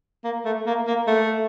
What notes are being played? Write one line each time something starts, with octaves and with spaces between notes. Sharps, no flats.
A#3
A3
A#3
A#3
A3